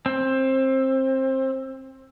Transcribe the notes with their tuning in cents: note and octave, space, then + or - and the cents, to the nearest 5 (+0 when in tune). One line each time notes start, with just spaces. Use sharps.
C4 +20